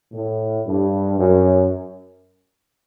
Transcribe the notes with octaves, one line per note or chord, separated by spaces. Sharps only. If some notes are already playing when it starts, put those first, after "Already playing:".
A2
G2
F#2